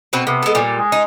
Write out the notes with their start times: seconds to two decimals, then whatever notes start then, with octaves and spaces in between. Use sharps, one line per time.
0.13 B2 C4 B4
0.27 C3 B3
0.43 G#3 A4
0.55 A#2 G3
0.77 G#3
0.92 D#4